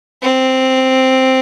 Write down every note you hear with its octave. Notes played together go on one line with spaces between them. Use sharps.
C4